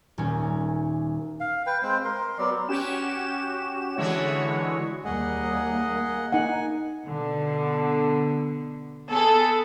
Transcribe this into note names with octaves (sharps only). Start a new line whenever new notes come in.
D#1 C#4
F5
B4 G5
G#3 C4 C5
A#4 C6
F#3 B3 D5
C#4 F#4 G4 E7
D3 E3 G#3 E4 F#4 C#5
D#2 G3 A#3 G#4 D#5 F#5
A#3
D#4 F#5 G#5
B2 D3
B3 G#4 A4